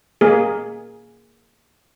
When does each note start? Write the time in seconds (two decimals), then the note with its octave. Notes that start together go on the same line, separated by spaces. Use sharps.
0.21 A#3 G#4